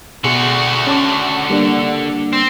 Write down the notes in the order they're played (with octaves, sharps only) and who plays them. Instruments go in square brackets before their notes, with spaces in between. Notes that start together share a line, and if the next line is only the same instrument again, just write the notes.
[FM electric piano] B2 G#4 C6 [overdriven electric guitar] D3 F#4
[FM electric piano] C#4 A5 D6
G3 A#3 D4
[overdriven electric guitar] C4